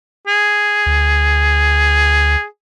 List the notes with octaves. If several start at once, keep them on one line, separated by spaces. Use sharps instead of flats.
G#4
D2